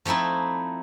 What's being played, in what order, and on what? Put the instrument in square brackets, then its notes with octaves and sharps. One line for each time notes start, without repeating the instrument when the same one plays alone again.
[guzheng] F3 A3 C4 D#4 E4